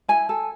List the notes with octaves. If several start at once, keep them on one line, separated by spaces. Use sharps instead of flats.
E4 G#5
A4